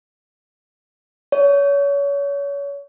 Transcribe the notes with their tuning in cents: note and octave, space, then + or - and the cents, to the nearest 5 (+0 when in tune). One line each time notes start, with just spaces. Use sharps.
C#5 +30